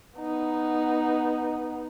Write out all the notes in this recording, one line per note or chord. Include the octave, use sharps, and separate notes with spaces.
B3 D#4